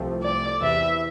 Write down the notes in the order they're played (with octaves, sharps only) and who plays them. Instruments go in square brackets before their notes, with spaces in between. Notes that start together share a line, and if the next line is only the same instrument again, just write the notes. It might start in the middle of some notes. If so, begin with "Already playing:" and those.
Already playing: [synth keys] C2 C3 F3 A3 C4
[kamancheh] D5
[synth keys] E2 C3 E3 [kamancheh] E5